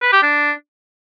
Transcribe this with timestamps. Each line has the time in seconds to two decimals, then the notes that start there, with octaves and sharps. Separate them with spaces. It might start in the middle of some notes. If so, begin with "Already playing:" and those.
0.02 B4
0.12 G4
0.23 D4